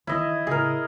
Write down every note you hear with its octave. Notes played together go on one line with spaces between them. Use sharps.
D#3 E3 E4 D#5
A2 C#3 G#4 A#4